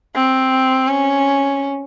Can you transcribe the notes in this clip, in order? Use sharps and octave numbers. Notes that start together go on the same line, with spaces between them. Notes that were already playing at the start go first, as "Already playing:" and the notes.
C4
C#4